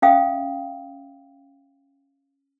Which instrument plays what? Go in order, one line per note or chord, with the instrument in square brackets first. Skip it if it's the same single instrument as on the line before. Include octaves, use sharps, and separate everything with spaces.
[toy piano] C#4 E5 F5 G5 D#6